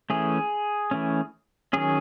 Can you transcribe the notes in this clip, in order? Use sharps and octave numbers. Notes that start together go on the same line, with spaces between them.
E3 A3 C#4 G#4
E3 A3 C#4
D#3 F#3 C#4 G#4